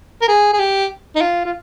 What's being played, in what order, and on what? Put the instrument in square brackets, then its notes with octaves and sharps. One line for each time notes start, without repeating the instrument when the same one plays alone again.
[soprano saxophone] A#4
G#4
G#4
G4
D#4
F4
F4